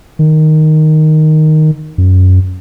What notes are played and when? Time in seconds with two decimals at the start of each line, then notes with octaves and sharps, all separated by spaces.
0.19 D#3
1.98 F#2